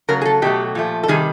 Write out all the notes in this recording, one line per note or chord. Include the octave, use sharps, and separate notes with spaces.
C#3 F#3 A3 A#4
G#4
A4
B2 F#3 A3 G4
A#2 F3 A3
A4
C3 D#3 G3 G#4